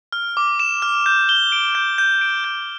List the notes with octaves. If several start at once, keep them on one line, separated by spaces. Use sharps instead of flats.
F6
D6
E7
F6
G6
G7
D7
G6
G6
D7
G6